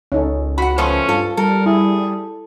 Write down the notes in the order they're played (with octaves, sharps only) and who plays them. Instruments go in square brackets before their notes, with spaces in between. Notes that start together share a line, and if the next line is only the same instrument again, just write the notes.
[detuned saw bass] C#2 [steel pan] C#4 D#4 A4
[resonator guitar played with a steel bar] F#4 F#5 [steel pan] B5
[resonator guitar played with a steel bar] F3 A3 B3 [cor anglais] C#4 [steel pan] C5
[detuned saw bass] G2 [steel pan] F4 [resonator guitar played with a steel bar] A4
[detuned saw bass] G3 [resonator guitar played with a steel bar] A4 [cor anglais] A#4
[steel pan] E4 [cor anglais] G#4